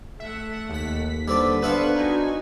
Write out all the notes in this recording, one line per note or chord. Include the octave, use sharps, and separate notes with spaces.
A3 E5 F#5
D#2 B6
D3 G3 C4 A4 B4 D5
B3 D4 B4 C5 E5 F5 B5 C#6
D#4 F#4 G#5